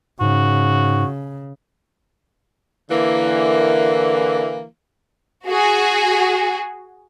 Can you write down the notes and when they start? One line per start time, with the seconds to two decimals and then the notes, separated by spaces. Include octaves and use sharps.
0.21 G#2 C#3 F#4
2.90 D3 E3 A#3
5.47 F#4 G#4